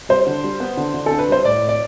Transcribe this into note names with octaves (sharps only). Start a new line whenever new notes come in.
G3 C5
D3
G3
B3
D3
D3
D3 A4
B4
G3 C5
A2 D5
A2
D5